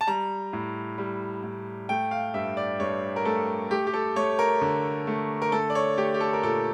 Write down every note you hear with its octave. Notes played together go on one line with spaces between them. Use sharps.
A5
G3 A#5
A2
G3
A2
A3 G5
F5
G2 E5
D5
G2 C#5
A#4
A3 A4
A3 G4
G4
A4
A3 C#5
A#4
D3
A3
A#4
A3 A4
D5
C#5
A3 G4
G4
A4
A#4
A#2 A4